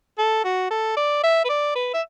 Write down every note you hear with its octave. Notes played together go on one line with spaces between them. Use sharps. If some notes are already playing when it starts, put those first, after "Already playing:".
A4
F#4
A4
D5
E5
B4
D5
B4
E5